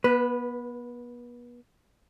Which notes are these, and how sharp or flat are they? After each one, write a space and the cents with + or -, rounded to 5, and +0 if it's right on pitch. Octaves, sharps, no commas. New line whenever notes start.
B3 -35 B4 +0